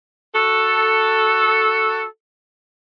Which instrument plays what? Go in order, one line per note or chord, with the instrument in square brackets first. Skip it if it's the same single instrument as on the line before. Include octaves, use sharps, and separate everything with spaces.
[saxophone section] F#4 A4